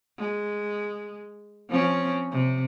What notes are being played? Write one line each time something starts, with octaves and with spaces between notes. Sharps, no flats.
G#3
F3 C4 C#4
C3